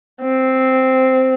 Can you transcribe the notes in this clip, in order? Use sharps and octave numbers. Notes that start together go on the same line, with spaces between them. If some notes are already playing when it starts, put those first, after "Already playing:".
C4